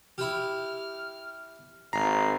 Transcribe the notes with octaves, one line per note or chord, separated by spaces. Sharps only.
E4 G4 F6
G#1 A#5 C7